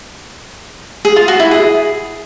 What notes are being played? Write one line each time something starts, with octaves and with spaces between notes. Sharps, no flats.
G#4
F4
F#4
E4
G#4